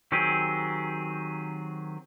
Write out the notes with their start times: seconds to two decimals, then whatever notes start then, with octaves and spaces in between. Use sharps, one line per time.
0.12 D#3 F#3 C4 G4 G#4